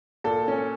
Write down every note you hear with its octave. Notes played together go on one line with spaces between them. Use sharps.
A#2 A4
C#4